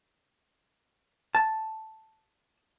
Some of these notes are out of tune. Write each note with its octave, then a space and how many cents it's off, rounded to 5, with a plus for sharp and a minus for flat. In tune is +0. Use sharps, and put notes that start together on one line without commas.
A5 +0